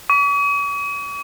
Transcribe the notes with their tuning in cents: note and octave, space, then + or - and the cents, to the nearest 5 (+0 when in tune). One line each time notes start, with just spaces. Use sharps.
C#6 +45